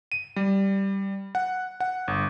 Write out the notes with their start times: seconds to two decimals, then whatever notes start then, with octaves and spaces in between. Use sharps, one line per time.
0.12 D#7
0.36 G3
1.35 F#5
1.80 F#5
2.08 G1